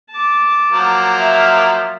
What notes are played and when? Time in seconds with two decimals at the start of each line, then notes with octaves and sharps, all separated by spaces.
0.11 A5 D6
0.71 F3 F#3 A#3
1.19 E5 F5